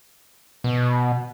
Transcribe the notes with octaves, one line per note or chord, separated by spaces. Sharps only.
B2